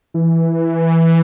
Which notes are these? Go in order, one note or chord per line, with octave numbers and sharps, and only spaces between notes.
E3